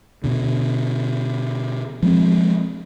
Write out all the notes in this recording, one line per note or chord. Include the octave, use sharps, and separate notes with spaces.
B2 D3
F3 G#3 C4